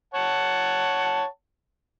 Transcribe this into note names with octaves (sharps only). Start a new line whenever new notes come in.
C#5 F#5 A5